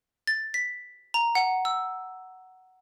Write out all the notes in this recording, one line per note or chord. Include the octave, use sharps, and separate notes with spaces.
A6
B6
A#5
F#5
E6